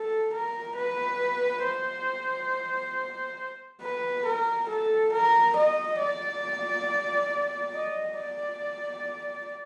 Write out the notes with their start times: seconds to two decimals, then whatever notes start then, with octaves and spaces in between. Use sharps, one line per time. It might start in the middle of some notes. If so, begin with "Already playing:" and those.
Already playing: A4
0.33 A#4
0.76 B4
1.64 C5
3.81 B4
4.25 A#4
4.69 A4
5.12 A#4
5.56 D#5
5.99 D5
7.74 D#5
8.17 D5